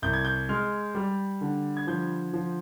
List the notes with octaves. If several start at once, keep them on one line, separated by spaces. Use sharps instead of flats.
C2 G6
G#6
G6
G#3 F6
G3
D3
G#6
F3 G6
F3